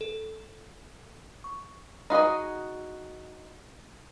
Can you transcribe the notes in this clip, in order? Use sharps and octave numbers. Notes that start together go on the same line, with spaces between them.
A4
C#6
D#4 F#4 G#4 D#5